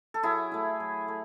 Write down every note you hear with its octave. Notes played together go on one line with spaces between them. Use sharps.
A4
F#3 E4 G#4
A3 E4
F#3
A3